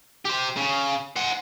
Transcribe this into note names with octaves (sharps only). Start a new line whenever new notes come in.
G4 C5
C#3
C5 F#5